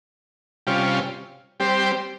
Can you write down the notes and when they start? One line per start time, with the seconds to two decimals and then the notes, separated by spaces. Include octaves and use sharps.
0.67 C3 G3 C#4 F4
1.60 G3 C4 G4 C5